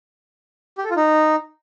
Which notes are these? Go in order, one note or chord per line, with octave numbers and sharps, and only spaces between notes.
G4
A4
F4
D#4